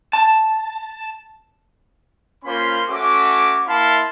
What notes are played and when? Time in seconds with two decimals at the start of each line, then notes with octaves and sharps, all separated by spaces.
0.13 A5
2.44 A#3 C#4 F4 C5 B5 C6
2.88 A3 C#4 F#4 E5 D6
3.67 A#3 E4 F5 A5 B5 C6